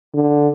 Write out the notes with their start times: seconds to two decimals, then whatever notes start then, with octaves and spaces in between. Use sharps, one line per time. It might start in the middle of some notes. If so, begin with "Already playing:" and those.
0.14 D3